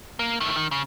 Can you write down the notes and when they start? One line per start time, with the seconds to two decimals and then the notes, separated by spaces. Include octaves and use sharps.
0.19 A#3
0.40 D#3 A3
0.56 D#3
0.71 C#3